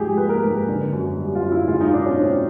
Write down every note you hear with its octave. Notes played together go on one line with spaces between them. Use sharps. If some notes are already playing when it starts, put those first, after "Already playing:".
Already playing: G#2 F3 A3 G4 G#4
A#3 B4
A#4
G#2 B4
D3
F#2
G3
F4
F#2
E4
G#3 F4
D#4
B2 D4
C#4
C4 D4